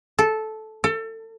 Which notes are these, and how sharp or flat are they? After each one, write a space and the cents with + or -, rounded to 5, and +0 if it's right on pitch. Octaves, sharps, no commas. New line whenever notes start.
A4 -10
A4 +30